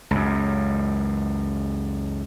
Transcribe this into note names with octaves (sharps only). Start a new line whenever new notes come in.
C#2 F#2